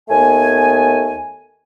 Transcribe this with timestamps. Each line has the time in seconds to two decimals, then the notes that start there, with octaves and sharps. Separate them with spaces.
0.09 D#2 A3 B3 G#5